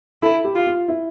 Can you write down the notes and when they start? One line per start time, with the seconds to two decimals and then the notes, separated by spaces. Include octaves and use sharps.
0.22 E4 A4
0.44 G4
0.55 F4
0.66 F4
0.88 E4